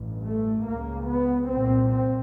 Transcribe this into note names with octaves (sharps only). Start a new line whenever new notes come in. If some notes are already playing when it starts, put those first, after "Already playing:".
Already playing: A1 G2
A3
C#2 C#3 A#3
B3
C2 A#2 C4
C4